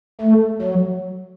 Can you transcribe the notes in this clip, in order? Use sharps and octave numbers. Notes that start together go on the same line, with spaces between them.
A3
F#3